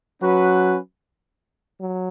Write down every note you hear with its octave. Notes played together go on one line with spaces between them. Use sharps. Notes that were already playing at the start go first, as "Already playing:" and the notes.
F#3 C#4 F#4 B4
F#3